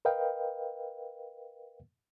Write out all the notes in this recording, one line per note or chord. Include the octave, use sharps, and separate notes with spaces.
A#4 B4 D#5 F5 G5